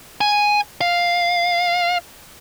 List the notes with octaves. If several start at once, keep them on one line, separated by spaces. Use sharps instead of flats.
G#5
F5